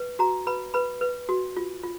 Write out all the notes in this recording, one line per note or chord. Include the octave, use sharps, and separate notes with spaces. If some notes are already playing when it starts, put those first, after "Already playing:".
Already playing: B4
F#4 A#5
B4 B5
B4 B5
B4
F#4
F4
F4